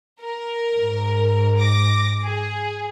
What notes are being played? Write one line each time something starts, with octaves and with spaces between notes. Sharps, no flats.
A#4
G#2
D6 A#6
G#4